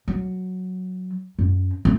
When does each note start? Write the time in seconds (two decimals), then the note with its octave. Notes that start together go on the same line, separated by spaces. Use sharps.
0.08 F#3
1.39 F#2
1.85 A3